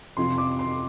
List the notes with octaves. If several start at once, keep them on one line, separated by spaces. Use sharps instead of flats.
F2 C3 F3 C6
D6
C6